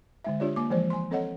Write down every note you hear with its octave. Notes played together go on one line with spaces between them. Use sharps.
D3 G#3 E5
D4 F4 G4 C#5 D5
A#3 D6
E3 F3 G#3 C5 D5
G#5 C6
C4 A4 C#5 D#5 F#5